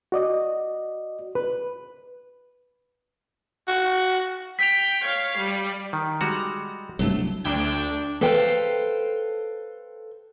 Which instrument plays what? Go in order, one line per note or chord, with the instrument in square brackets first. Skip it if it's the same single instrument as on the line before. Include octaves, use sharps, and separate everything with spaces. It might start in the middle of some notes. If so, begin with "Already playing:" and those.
[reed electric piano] F#4 D5 D#5
[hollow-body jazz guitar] B4
[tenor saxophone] F#4
[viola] G5 [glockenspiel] B6 F7
[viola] C#5 F5
G3
[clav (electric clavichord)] D#3
[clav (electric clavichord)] G3 G#3 F#4 [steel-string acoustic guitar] A#5
[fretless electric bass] C2 G2 [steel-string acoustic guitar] F#3 A3
[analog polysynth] D2 G5 G#6 [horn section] D4
[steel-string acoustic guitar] A4 B4 C5 F5 G5